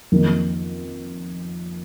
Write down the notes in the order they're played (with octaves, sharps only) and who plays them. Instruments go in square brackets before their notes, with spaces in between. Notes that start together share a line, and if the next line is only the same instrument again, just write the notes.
[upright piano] F2 D#3 A#3